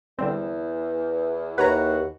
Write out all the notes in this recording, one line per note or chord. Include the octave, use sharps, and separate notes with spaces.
E2 D3 G3 C4
D#2 E3 F#4 B4 C#5 F#5 A#5